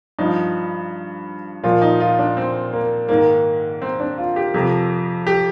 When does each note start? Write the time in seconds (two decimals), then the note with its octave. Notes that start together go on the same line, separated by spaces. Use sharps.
0.19 G2 F3 D#4
1.64 A#2 F3 F4
1.82 D#4
2.00 F4
2.19 D4
2.37 C4
2.73 A#3
3.09 G#2 D#3 A#3
3.82 C4
4.00 D4
4.18 F4
4.36 G4
4.54 F2 C3 F3 G4
5.27 G4